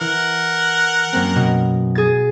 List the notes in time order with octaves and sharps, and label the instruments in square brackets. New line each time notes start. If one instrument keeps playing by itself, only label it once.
[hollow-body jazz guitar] E3 [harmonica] A#4 F#5
[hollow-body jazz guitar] F#2 A#3 C4
[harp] B2
G#4 A6